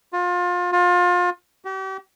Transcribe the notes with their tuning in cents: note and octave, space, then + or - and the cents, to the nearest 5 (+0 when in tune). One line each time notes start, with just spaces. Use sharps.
F4 +30
F4 +30
G4 -40